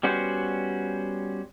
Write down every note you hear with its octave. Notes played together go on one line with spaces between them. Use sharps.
G3 B3 C#4 F#4 C5